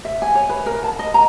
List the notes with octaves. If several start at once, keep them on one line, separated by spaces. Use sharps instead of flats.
E5
G#5
C#5
B4
A#4
A5
D#5
A#5